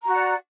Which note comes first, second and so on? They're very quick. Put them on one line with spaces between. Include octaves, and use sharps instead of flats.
A#5 F#4 F#5 D5